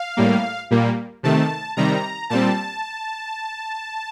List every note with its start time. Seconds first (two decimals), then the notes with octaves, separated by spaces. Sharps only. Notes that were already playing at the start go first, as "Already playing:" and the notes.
Already playing: F5
0.17 A2 G3 A#3
0.71 A#2 G3 A#3
1.23 C3 D#3 A3 A5
1.76 C3 D#3 G3 A#5
2.30 A#2 G3 C4 A5